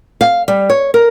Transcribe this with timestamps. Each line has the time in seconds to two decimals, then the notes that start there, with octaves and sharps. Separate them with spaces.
0.21 F5
0.48 G3
0.70 C#5
0.94 A#4